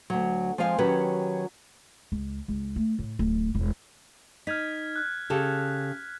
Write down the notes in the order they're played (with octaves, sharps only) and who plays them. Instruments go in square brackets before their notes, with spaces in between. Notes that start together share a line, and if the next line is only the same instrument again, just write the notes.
[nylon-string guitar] D2 F#3
F3 G#3 C4 C5 F5 G#5
D#3 F#3 C#4 F#4 G4 B4
[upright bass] C#2
C#2
A3
A2
D1
E1
[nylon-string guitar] D#4 [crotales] F6 G#6 B6
[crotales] F6 F#6
[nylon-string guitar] C#3 G4 A4